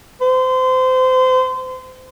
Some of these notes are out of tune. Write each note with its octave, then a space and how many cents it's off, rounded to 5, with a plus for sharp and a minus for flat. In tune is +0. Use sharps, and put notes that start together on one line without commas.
C5 -30